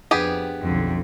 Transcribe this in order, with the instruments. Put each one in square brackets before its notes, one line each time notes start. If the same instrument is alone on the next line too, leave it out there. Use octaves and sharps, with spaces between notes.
[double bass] F2 D4 [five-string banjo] B3 G4 G#4
[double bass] B1 D3 [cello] F2